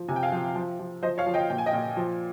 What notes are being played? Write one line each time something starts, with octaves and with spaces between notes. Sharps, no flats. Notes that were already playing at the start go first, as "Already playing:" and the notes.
Already playing: F3
C3 G#5
G5
F5 G#5
F3
F3
F3
F3 C5 D#5
C#5 F5
F3
D#5 G5
A#2 G5
G#5
D#5 G5
A#2
F3